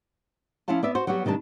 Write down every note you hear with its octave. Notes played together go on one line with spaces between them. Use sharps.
F3 C#4 E4 F4 F5 A5
B3 D5 E5
F#4 C5
F#3 G3 B3 F#4 G4
C3 D#3 G3 D4 A5